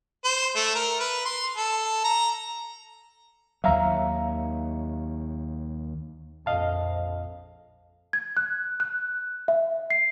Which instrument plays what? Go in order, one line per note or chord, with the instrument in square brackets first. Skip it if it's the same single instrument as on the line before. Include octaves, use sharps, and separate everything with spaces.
[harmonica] C5
A3
A#4
B4
C6
A4
A#5
[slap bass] D#2 F#3 [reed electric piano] E5 F5 A#5
[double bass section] A#1 F2 [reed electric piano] D#5 F5 A5
[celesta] G#6
F#6
F#6
E5
C7